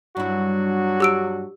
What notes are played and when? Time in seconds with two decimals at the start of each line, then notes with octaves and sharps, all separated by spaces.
0.17 G2 F#3 D4 E4 F#4
1.00 G4 E6 D7